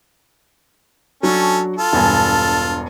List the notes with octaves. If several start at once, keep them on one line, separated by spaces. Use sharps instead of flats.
F#3 C#4 D4 A4
F4 A4
E1 G2 G#5